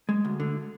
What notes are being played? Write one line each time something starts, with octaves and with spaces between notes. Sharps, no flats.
G#3
D2
D3